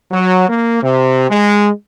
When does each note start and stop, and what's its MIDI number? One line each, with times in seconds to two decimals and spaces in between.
0.11 0.46 54
0.49 0.80 58
0.83 1.30 48
1.30 1.69 56